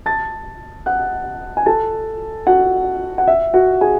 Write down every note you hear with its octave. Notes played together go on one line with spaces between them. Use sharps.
A5 A6
F#5 F#6
G#5
A4 A5
F#4 F#5
F#5
E5
F#4 F#5
G#4 G#5